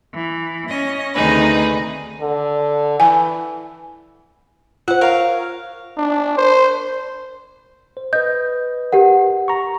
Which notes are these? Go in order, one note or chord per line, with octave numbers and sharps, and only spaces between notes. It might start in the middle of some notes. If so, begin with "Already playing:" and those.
E3
C#4 D#5
D2 C3 D#3 D#4 G#4 B4
D3
E3 G#5
F4 C5 F#5
A#4 C#5 F5
D4
C5
C5
B4 D#5 G6
G4 A#4 F#5
A#5 C#6